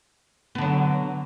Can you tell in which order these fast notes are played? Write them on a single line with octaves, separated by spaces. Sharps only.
B3 D3 F#3